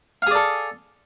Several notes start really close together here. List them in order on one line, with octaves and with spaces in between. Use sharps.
F5 G#4 D5 A4